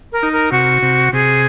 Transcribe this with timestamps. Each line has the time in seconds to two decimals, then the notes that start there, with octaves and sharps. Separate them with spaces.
0.12 A#4
0.23 D#4
0.33 A#4
0.52 C3 F#4
0.82 C3
1.13 C3 G#4